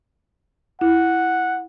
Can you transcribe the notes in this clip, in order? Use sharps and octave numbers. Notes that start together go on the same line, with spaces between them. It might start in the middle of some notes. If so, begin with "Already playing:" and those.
E4 F#5